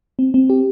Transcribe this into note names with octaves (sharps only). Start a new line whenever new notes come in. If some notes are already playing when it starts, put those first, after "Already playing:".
C4
C4
G4